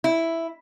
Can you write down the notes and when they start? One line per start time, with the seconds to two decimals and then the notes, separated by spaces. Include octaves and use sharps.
0.04 E4